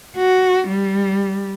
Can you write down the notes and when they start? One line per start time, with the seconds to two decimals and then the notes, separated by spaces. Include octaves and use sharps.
0.17 F#4
0.68 G3